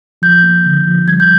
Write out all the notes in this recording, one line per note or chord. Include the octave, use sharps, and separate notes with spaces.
F3 G6
A#3
D3
F3
G3 G#6
G6